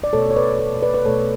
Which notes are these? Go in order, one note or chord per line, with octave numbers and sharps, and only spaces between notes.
D5
B2 A3 A4 C#5
C#5
B4 D5
A4 C#5
B4 D5
B4
B2 A3 A4 C#5